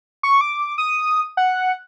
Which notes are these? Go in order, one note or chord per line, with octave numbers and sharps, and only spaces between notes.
C#6
D6
D#6
F#5